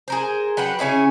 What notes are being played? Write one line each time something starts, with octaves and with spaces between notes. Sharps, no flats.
G#4 A#4 C5
F#3 G4 B4 F#5
C#3 C#4 E4 G#4